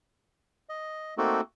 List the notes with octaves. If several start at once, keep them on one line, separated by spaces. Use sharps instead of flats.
D#5
A3 A#3 C4 D#4 F#4 A4